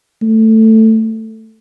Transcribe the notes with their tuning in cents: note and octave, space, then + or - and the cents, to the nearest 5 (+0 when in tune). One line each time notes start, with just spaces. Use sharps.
A3 +10